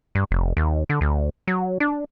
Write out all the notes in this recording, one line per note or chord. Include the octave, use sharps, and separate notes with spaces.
G2
F1
D#2
D3
D2
F#3
D4